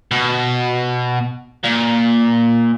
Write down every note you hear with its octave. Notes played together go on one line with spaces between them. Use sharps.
B2
A#2